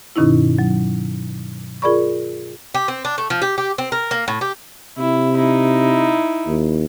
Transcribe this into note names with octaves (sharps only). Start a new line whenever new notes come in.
G2 B2 D#3 C#4 D#4 E4
F#3
F4 G#4 A#4 D5 B5 C#6
G4
C4
D4
A3
F3
G4
G4
C4
A#4
A#3
A2
G4
C3 E4
D#4 E4
D#2